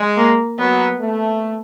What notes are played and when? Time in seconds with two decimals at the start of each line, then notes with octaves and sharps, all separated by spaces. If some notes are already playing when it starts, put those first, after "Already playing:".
Already playing: G#3
0.17 A#3
0.59 F#3 B3
1.00 A3